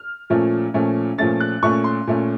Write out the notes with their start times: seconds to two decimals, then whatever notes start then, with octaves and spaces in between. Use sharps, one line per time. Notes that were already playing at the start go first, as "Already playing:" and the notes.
Already playing: F6
0.30 A#2 F3 A3 C#4
0.74 A#2 F3 A3 C#4
1.18 A#2 F3 A3 C#4 A6
1.40 F#6
1.63 A#2 A3 C#4 C#6
1.84 C6
2.07 A#2 A3 C#4